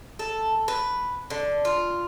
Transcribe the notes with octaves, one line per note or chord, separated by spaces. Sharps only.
A4
B4
D3
F4